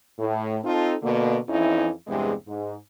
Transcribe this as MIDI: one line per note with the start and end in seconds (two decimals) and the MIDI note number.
0.18 0.57 45
0.64 0.94 60
0.64 0.94 63
0.64 0.94 65
0.64 0.94 69
1.02 1.37 47
1.02 1.37 50
1.02 1.37 58
1.48 1.90 41
1.48 1.90 52
1.48 1.90 61
1.48 1.90 63
1.48 1.90 64
2.07 2.32 40
2.07 2.32 43
2.07 2.32 48
2.07 2.32 56
2.47 2.74 44